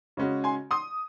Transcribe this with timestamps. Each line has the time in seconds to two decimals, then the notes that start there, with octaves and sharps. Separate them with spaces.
0.17 C#3 G#3 C#4 F#4
0.44 G#5 C6
0.71 C6 D#6